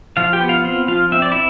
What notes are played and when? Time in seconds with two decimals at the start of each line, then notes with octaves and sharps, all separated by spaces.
0.17 F3 F4 F5
0.33 G4 G5
0.40 B3
0.49 F4 F5
0.64 C4 F4 F5
0.88 F3 F4 F5
1.12 C4 E5
1.22 D5
1.32 E4 E5